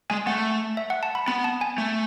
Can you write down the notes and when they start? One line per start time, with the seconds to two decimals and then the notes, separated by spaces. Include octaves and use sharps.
0.10 G#3 G#5
0.27 A3 F#5
0.77 E5
0.90 F#5
1.03 A5
1.15 B5
1.28 B3 B5
1.44 A5
1.61 G#5
1.78 A3